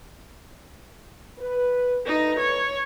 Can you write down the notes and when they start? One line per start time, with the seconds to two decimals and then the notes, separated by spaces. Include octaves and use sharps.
1.39 B4
2.07 D2 D#4 A4 B4
2.39 C#5